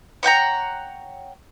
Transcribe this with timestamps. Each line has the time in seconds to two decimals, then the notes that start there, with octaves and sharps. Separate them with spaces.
0.23 C#5 F#5 G5 A#5